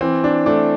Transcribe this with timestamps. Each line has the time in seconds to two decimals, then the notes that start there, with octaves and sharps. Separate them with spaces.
0.01 E3 C4
0.24 D4
0.46 A3 D4